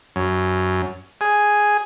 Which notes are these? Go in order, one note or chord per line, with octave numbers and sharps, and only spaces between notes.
F#2
G#4